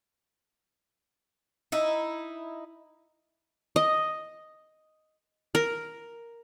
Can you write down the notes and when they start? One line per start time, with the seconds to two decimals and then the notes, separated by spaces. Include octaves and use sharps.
1.72 D#4 E4
3.76 D#5
5.55 A#4